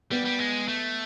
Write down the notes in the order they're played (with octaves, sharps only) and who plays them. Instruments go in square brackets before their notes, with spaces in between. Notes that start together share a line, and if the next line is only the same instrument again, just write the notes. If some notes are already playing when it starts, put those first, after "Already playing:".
[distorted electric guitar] G3 [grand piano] B3
[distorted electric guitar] G3
G#3
A3